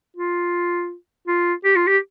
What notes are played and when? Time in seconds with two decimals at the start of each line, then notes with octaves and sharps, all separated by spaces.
0.16 F4
1.27 F4
1.65 G4
1.76 F4
1.87 G4